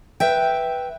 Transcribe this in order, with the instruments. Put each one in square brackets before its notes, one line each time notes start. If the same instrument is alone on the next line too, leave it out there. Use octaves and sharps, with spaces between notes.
[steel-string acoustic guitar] B4 E5 G5